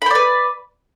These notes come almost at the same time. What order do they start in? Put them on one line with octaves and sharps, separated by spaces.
B5 C5 D5 B4